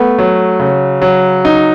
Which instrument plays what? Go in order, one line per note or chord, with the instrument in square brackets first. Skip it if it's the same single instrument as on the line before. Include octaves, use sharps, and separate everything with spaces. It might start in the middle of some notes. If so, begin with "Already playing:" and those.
Already playing: [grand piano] A3 [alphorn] B3
[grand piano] F#3
C#3
F#3
D#4